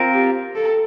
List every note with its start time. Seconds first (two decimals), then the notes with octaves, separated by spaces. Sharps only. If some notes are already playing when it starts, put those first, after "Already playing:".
Already playing: C4 F4 A#4
0.13 G4
0.55 A4